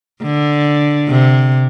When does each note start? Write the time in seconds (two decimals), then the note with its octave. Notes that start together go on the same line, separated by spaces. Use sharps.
0.23 D3
1.08 C3